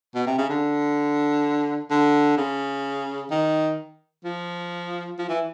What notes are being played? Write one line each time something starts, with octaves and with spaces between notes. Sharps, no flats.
B2
C3
C#3
D3
D3
C#3
D#3
F3
F3
E3